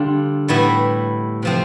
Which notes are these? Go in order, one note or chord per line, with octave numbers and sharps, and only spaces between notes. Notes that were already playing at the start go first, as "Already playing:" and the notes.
Already playing: D3 G3 D4 F4
A2 G3 B3 E4
C3 F3 C4